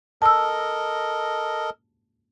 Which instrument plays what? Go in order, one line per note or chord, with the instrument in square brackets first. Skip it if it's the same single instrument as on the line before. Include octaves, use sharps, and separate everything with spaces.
[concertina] A4 A#4 D#5 [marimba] A5 E6